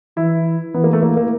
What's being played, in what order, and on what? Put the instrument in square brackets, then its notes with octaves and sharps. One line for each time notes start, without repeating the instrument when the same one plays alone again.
[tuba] E3 [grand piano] E4
[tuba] E3 [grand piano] B3
[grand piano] A#3
A3
A#3
A#3